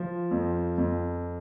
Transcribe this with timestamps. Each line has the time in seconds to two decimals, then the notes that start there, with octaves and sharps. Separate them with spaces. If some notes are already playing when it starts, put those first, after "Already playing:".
Already playing: F3
0.31 F2
0.78 F2